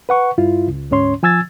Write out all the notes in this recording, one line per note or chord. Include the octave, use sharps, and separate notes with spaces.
B4 F#5 C#6
G2 E4 F4
C#2
D2 G#2 C#4 C#5 C6
F3 G#5 E6 G#6 A6